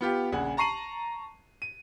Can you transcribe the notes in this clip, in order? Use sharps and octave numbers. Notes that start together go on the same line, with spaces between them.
B3 F4 G4
A#1 C#3 F#5 G#5
A5 A#5 C#6 C7 D#7 F#7
D#7